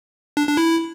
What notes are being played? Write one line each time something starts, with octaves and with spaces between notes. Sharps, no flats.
D4
D4
E4